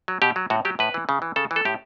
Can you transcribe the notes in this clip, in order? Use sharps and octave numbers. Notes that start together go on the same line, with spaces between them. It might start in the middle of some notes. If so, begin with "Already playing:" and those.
F#3
B2 G4
F#3
A2 F#4
F#3 G4
A2 B4
E3
C#3
E3
C#3 A4
E3
A4
A2 G4